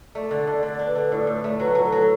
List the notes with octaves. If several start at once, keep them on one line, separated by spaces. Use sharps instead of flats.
A3 D5
D3
D3
D3 D5
D4
B4
D3
A2 D5
A2
A3
F#3 B4
F#3
A4
F#3